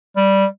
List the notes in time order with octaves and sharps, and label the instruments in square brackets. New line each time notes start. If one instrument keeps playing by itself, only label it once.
[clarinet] G3